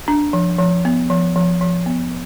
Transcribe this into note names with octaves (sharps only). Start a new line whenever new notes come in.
D4
F3
F3
B3
F3
F3
F3
B3